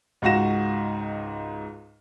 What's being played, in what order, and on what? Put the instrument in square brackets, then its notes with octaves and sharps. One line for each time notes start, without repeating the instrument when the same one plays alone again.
[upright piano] C#2 G#2 F#4 F5 A#6 E7